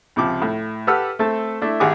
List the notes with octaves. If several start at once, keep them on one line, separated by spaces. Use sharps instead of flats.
C#2 C3 F3 D6
A2
G4 A4 B4 F#5 E6 F6
A3 C4 A4 A5
A3 D4 E4
G#1 G4 G#4 F#5 G#5 D6